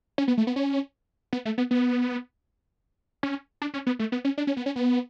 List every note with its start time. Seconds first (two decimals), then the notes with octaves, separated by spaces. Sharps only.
0.18 C#4
0.28 B3
0.38 A3
0.47 B3
0.56 C#4
1.33 B3
1.45 A3
1.58 B3
1.71 B3
3.23 C#4
3.62 D4
3.74 C#4
3.87 B3
3.99 A3
4.12 B3
4.25 C#4
4.38 D4
4.47 C#4
4.57 B3
4.66 C#4
4.76 B3